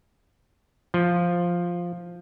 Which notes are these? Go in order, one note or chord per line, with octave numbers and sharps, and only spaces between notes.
F3